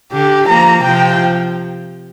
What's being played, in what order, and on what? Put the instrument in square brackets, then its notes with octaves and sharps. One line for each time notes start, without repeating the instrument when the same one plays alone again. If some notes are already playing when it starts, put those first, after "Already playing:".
[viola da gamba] D3 [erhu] G4
[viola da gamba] F3 A#3 [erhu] A#5
[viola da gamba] C3 F3 [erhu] G5